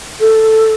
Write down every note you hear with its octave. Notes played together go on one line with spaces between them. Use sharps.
A4